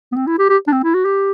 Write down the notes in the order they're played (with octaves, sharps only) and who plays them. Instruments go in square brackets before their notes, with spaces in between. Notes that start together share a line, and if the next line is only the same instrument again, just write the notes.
[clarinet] B3
C4
E4
G4
G4
D4
C4
E4
F#4
G4